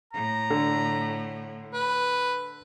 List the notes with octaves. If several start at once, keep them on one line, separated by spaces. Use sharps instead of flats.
A2 A#5
D3
B4